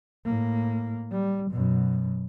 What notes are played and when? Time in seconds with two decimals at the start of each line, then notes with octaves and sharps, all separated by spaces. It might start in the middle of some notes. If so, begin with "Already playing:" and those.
0.25 A2 A#3
1.11 G3
1.51 F#2 B2